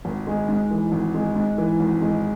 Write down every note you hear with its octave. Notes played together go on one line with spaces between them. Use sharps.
G#1
G#3
G#2
E3
G#1
G#3
G#2
E3
G#1
G#3